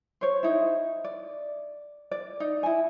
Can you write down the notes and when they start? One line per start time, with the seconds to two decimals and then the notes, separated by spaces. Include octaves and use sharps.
0.21 C5 C#5
0.43 D#4 E4
1.04 D5
2.11 D5
2.40 D#4
2.63 E4 G#5